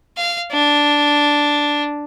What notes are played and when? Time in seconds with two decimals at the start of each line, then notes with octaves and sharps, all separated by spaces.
0.17 F5
0.52 D4